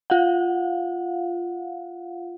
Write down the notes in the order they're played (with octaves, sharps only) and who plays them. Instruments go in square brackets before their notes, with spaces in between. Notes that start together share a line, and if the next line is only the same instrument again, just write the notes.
[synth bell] F4 F5 F#5